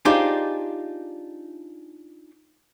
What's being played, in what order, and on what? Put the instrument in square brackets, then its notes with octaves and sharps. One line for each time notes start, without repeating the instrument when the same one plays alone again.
[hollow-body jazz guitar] D4 D#4 F4 G4 G#4 C5